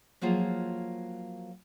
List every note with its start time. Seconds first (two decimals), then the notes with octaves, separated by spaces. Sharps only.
0.21 F3 F#3 A#3 F4 G#4